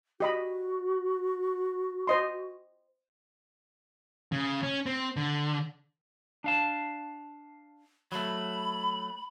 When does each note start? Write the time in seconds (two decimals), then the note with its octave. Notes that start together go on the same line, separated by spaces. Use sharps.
0.20 F#4 G4 D#5 B5
2.07 C5 D#5 C6
4.32 C#3
4.63 C#4
4.86 C4
5.16 D3
6.44 D4 F5 A5
8.12 F#3 A3 B5